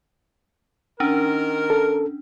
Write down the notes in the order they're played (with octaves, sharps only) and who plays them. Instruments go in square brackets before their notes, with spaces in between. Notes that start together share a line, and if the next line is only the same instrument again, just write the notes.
[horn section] D#3 A#4 [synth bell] C#4 D4
[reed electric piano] A4